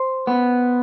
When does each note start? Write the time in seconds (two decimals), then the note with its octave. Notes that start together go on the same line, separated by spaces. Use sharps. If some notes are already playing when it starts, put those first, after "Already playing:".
Already playing: C5
0.27 B3